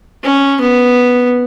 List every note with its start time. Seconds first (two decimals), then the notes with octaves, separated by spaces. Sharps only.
0.23 C#4
0.61 B3